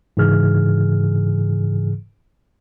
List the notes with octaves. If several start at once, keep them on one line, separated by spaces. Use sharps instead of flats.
G#2 C#3 E3 G#4 F6